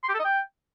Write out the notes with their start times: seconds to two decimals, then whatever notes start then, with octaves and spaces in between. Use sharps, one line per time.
0.04 C6
0.09 G4
0.14 A4
0.19 D#5
0.25 G5